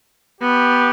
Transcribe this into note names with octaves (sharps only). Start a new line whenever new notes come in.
B3 G4